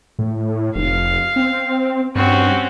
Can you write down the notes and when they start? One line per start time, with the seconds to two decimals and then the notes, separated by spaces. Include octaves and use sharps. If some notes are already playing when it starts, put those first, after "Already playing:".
0.19 A2
0.76 F1 F5
1.36 C4
2.16 G2 C4 C#4 F#4